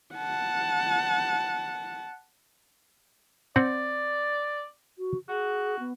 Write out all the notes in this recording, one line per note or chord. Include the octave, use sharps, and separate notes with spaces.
F#5 A5
C4 D5 F#5
F#4
F#4 G#4
B3